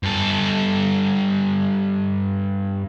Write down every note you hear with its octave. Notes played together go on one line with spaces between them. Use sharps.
G2 A4